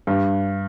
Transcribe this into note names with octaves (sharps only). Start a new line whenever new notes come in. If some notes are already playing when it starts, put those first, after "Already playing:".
G2